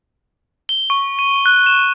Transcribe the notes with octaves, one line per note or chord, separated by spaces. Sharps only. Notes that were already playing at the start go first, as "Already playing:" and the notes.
G7
C#6
D#7
F#6
E7